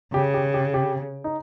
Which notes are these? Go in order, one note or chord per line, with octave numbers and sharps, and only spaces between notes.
C#3 G4
G4
G4
G4
D#4